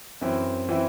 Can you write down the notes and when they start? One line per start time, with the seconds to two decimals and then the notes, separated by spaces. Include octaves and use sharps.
0.21 F#2 E3 C4 E4
0.69 E3 C4 E4